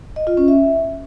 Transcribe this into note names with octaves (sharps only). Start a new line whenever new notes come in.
D#5
F4
C#4
E5